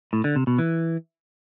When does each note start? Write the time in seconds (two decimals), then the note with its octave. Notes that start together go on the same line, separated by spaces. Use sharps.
0.13 A2
0.24 D3
0.36 C3
0.47 B2
0.59 E3